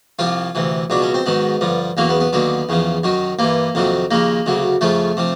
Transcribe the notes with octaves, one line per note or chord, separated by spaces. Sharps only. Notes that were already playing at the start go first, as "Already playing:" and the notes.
C2 C3 F3 F4
D2 C3 E3
C#2 B2 F#3 D4
C#4
C4
G#2 D#3 F#3 B3
G2 D3 F3
E2 C#3 F#3 A#3
B3
B3
D#2 D3 F#3 B3
E2 C#3 F3
F#2 D#3 F#3
G2 E3 A#3
F2 C3 D#3 F#3
D#2 C#3 F3 A#3
D2 C#3 F#3
F2 C#3 F3 A3
C3 F3